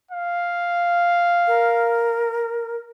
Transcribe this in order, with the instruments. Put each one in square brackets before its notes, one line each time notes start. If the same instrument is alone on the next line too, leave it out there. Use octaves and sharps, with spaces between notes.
[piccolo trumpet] F5
[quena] A#4